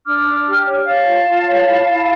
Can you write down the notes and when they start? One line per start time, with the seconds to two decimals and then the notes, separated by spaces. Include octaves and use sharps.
0.06 D4 D6 F6
0.25 D4
0.46 G4
0.66 C#5
0.85 C#5 F5 A5
1.06 F4
1.26 F4
1.46 C#5
1.66 E4
1.87 E4